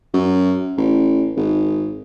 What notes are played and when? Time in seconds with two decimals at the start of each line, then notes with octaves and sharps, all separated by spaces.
0.14 F#2
0.77 A1
1.37 G#1